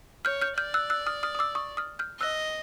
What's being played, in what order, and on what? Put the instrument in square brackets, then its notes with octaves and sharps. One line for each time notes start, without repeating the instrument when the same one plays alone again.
[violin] C#5 [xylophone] F6 G6
[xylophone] F6 G6
[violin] D5 [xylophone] F6 G6
[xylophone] E6 F#6
E6 F#6
D#6 F6
D#6 F6
D#6
D6 E6
C#6 D#6
D#6 F6
F6 G6
[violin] D#5 [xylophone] E6 F#6